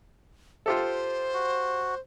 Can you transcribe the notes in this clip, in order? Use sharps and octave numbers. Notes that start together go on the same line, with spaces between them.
F4 G4 A4 C5
F#4